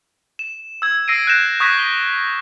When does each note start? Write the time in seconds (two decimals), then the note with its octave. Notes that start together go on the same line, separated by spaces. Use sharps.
0.39 E7
0.82 E6 G#6
1.08 E6 A#6 C7 D7 D#7
1.27 F#6 G6 A#6 E7
1.60 C#6 D#6 F#6 G#6 A#6 B6
1.79 G7